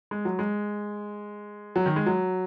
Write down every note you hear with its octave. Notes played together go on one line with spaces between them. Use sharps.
G#3
F#3
G#3
F#3
D#3
G#3
F#3